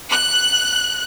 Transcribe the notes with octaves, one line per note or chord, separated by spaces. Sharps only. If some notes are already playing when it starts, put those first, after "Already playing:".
F#6